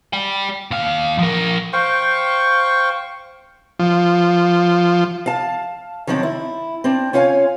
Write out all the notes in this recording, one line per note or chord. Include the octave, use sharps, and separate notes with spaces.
D5 G5
D#2 F5
F3 A#4
C5 F5 G5 C#6
F3
F5 A5
D#3 F3 F#3 C4 D4
E4
C4 D4
C#4 F4 C#5 F5 G#5